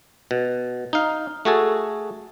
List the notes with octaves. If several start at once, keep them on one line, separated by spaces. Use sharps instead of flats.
B2
D#4 F5
A3 F#4 G#4 A4